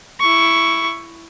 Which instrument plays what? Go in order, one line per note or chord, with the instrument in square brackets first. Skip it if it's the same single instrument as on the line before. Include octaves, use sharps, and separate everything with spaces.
[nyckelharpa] E4 C#6